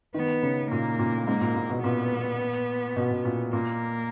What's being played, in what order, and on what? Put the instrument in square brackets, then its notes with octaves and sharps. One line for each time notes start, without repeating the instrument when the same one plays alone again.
[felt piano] D#3 [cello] B3
[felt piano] C#3
[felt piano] A#2 [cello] A#3
[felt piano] A#2
[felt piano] G#2 [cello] A#3
[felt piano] A#2
A#2
B2
[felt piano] A#2 [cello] B3
[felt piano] B2
B2
A#2
[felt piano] A#2 [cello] A#3